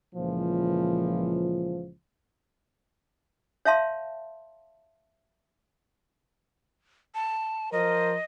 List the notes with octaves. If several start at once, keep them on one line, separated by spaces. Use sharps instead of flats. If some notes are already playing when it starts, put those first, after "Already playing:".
C#2 A#2 E3 F3
C#5 E5 F5 A5 C6
A5
F3 A#4 C5 D#5